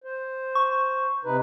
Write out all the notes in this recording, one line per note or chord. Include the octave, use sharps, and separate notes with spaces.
C5
C#6
C3 D#4 B4